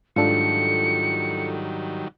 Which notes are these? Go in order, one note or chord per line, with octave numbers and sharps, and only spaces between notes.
G#2 D#3 F#3 G3 D4 F4 A4 C#7